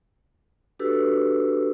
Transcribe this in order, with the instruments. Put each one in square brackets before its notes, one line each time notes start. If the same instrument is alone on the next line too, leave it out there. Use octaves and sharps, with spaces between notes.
[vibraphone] D4 F#4 G4 A4 B4 E6